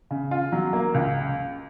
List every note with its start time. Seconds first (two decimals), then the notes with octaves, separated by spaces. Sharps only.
0.11 C#3
0.31 F4
0.52 F#3
0.73 A#3
0.94 C#2